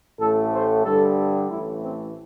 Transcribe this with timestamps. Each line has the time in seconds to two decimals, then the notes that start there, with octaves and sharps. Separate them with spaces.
0.18 A1 A2 A3 A4
0.51 C5
0.84 G2 D3 G3 A4
1.49 A1 A2 E3 A3 E4
1.82 C4